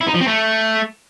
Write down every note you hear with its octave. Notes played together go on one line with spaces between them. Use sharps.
E4
D#4
F3
C4
A3